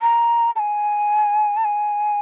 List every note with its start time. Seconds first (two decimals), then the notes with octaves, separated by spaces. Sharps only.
0.02 A#5
0.56 A5
0.59 G#5
1.57 A5
1.65 G#5